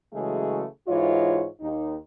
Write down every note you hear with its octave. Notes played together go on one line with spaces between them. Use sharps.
C#3 E3 F#3 G#3 A3 G#4
G#2 E3 F4 F#4 C#5 D#5
D#2 D#4